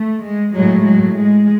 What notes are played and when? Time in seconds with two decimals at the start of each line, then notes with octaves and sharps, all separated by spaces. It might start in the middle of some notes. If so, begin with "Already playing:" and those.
Already playing: A3
0.23 G#3
0.55 A2 F#3 G#3
0.86 F#3
1.17 G#3